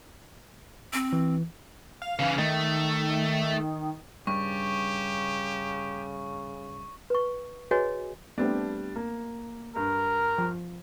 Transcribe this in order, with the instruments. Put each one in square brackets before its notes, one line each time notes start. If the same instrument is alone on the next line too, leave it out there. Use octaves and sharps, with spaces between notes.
[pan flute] C4
[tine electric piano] E3
[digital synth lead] F5
[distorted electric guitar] C#3 E3
[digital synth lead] D#3 [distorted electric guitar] A3
[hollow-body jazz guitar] G2 [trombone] C#3 [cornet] G4 [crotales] C#6
[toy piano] B4 C#6
F#4 G#4 B4 C#5 D#5 G#5
[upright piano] G3 D4 [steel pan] A3 B3 C4
[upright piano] A#3
[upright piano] G2 [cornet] A#4
[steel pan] F3